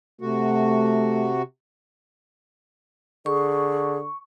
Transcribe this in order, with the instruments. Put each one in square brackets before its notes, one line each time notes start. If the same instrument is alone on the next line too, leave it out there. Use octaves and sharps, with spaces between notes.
[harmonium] C3 F#4 [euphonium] A3
[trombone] D3 [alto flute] G#4 [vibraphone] C#6